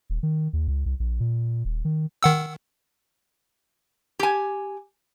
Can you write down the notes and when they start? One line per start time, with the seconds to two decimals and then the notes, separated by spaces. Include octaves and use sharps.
0.10 D#1
0.23 D#3
0.53 D#2
0.68 C#2
0.86 C2
1.00 A#1
1.20 A#2
1.65 D#1
1.85 D#3
2.23 D#3 F#5 E6
4.19 G4 G#5